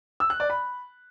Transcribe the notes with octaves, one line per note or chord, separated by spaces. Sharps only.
E6
F#6
D5
B5